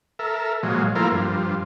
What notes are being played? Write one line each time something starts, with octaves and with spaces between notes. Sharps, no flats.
A4 A#4 E5
A#2 F3 F#3 G#3
F3 A3 A#3 E4 F4 A#4
G2 F3